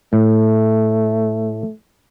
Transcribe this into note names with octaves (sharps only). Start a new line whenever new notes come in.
A2 A3